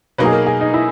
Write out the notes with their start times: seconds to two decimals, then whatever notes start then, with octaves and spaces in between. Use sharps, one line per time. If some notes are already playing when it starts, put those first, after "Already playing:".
0.18 B2 F#3 A#3 D#4 B4
0.25 G#4
0.33 A#4
0.46 G#4
0.61 D#4
0.74 E4